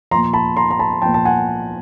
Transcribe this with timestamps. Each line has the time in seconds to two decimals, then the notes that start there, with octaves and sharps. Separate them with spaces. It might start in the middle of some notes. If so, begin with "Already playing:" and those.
0.11 F3 A#5 C6
0.15 A#2
0.33 A5 B5
0.57 A#5 C6
0.71 A#5
0.79 A5 B5
1.02 A#2 F3 G5 A5
1.14 A5
1.25 F#5 G#5